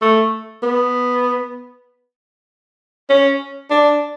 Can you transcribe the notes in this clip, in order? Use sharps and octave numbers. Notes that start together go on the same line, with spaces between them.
A3
B3
C#4
D4